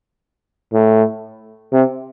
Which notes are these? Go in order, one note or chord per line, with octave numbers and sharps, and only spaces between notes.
A2
C3